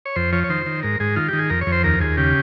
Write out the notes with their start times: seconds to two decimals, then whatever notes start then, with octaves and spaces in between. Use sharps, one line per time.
0.06 C#5
0.16 F2 C5
0.32 F3 C#5
0.44 C#5
0.49 D#3 C5
0.66 D#3
0.83 G#2 A#4
1.00 G#2 G#4
1.16 D#3 F4
1.28 D#3 G4
1.39 G#4
1.50 F2 A#4
1.61 C#5
1.67 F2
1.72 C5
1.84 D#2 A#4
2.00 D#2 G#4
2.17 C#3 G4